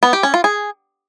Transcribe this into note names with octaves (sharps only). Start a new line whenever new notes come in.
B3
G4
C#4
F4
G#4